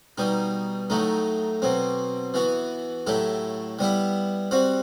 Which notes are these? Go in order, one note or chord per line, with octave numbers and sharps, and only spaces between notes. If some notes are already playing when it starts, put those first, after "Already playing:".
B2 G3 D#4
A2 F#3 A3 D#4
B2 F#3 C4
E3 B3 F#4
A2 F#3 A3 E4 G4
G3 B3 E4 G4
G3 C4 F#4